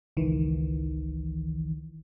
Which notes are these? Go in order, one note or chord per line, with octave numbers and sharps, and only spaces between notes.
G#1 C#2 D#3 E3